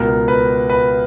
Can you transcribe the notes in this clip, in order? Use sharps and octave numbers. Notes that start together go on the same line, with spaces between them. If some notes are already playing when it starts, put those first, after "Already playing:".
Already playing: C#2 B2 A#4
B4
B4